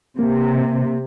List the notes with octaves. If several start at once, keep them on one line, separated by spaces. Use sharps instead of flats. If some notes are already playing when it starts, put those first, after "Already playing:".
C3 A#3